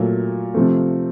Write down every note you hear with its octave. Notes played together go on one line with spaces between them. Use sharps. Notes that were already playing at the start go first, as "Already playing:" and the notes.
Already playing: A#2 F#3 A3
C3 F3 A3